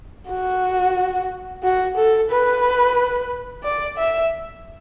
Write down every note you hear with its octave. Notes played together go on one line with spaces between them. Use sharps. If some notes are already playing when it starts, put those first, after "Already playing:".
F#4
F#4
A4
B4
D5
E5